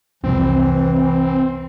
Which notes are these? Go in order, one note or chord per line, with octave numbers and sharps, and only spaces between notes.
C2 F2 E3 C4